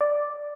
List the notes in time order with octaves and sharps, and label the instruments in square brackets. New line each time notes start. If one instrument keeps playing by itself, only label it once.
[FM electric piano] D5